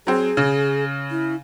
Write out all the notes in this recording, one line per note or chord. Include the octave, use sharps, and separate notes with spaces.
F#3 C4 G#4
C#3
E4